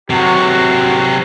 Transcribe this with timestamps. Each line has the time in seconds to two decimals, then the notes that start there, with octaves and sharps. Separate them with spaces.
0.10 C3 F#3 F#4